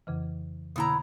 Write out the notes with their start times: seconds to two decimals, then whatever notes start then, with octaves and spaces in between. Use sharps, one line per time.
0.07 F2 C#3 E3
0.76 B2 D3 A#3 B3 E4 A#5